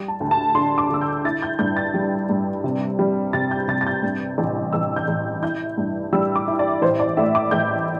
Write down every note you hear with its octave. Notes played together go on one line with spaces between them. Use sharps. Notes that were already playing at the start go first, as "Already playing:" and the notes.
Already playing: G3
A5
D2
A5
D3 C6
D6
D3 E6
G6
E4 A6
G6
G2 G6
A6
G3
G2
C3
G3
C3 A6
G6
C3 A6
A6
G6
G2
A1
A1 E6
G6
A1
E4 G6
G2
G3 E6
D6
E4
D5
A1 C5
D5
A2 E5
D6
A1 G6